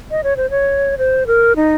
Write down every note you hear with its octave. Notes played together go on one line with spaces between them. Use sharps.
D#5
C#5
C5
C#5
C5
A#4
D#4